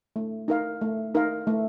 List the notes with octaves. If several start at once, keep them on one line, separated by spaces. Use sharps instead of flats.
A3
D#4 A#4 F5
A3
D#4 A#4 F5
A3